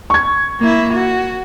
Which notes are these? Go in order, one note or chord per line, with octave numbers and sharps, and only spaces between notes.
C#6 G#6
A#3 E4
F#4